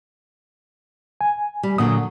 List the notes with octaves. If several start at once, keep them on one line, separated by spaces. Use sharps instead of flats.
G#5
G3
A#2 D3 F#3 D#6